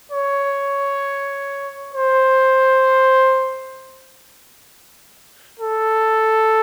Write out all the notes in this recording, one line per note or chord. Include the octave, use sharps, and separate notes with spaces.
C#5
C5
A4